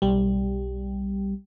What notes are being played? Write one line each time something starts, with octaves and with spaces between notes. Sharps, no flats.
B1 G3